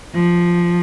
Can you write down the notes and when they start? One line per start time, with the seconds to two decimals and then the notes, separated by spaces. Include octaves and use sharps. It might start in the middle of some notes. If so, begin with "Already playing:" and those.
0.15 F3